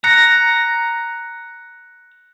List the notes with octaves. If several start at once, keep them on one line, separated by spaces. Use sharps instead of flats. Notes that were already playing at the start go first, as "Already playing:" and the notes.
A#5 F#6 A#6 C#7